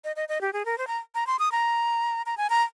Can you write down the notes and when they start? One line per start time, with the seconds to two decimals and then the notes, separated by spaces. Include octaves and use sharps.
0.04 D#5
0.16 D#5
0.29 D#5
0.41 G4
0.53 G#4
0.65 A#4
0.78 C5
0.87 A#5
1.15 A#5
1.27 C6
1.39 D#6
1.52 A#5
2.26 A#5
2.38 G#5
2.50 A#5